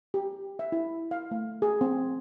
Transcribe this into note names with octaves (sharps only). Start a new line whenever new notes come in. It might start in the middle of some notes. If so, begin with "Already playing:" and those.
G4
E5
E4
F5
A3
G#4
C4